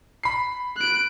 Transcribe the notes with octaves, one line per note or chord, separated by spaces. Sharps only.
B5 C7
F#6 D7